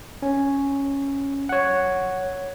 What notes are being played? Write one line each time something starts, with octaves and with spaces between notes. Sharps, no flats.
C#4
C#5 F#5